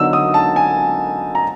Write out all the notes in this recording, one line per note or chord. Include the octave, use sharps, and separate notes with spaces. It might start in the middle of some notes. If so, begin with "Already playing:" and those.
Already playing: D3 F#3 B3 D#4 E6
D#6
A5
G#5
A#5